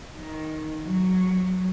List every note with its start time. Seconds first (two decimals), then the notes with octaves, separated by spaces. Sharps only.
0.16 D#3
0.86 F#3